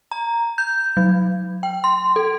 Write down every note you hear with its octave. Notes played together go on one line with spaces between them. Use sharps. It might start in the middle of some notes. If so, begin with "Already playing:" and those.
A#5
G6
F#3
G5
C6
A4